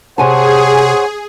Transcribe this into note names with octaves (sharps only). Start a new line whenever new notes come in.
C3 G#4 C5 C#5 F#5 G#5 A5